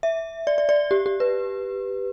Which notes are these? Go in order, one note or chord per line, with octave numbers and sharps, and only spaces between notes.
E5
D5
D5
D5
G4
G4
B4